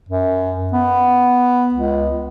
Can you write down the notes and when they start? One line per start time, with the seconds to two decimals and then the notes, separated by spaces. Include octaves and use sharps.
0.09 F#2
0.73 B3
1.74 C#2